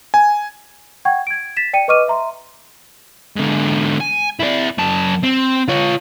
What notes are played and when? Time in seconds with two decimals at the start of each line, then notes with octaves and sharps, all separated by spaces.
0.14 G#5
1.05 F#5 G5 C#6 G#6
1.27 G#6 D7
1.57 A6 B6 E7
1.73 D5 G5 C#7 D#7
1.88 B4 D#5 C#6 D6 F6 D#7
2.08 E5 A#5 C6
3.36 G#2 D3
4.01 G#5
4.40 E4 D5
4.78 F#2 A5
5.23 C4
5.68 F4 C#5